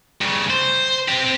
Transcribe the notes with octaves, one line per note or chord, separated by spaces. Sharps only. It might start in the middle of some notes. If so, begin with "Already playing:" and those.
G2 C#3
C5
C4 G4